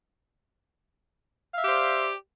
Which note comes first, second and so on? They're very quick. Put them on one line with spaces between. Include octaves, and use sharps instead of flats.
F5 E5 G4 C5 D5